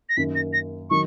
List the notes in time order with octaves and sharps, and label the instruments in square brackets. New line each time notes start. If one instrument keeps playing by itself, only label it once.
[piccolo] A#6
[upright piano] F#2 D#3 A#3 [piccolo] B6
[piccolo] A#6
A#6
[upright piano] D#3 F#3 [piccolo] C#6